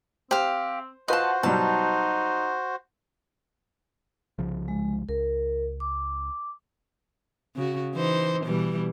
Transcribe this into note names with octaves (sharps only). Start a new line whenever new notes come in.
C4 G4 C5 F5
F4 F#4 B4 C5 D#5 F#5 A5 C6
B2 F#3 G3 D#4 A5
C2 C#3 F3
G#3
C#2 A#4
D6
C#3 F#4
E3 D#4 C5
B2 E3 G3